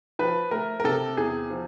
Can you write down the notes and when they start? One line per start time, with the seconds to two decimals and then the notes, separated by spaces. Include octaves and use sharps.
0.19 F3 B4
0.51 A3 A#4
0.80 A#4
0.84 C3 A4
1.17 E2 G#4
1.50 F3